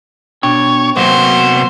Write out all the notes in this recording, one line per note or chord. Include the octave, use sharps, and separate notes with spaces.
B2 D4 C#5 G5
C3 F#3 A#3 B3 F#4 C5